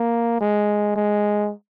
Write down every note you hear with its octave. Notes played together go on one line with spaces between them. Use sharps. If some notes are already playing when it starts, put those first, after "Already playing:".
Already playing: A#3
G#3
G#3